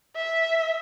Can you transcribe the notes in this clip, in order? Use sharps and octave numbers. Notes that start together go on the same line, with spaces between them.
E5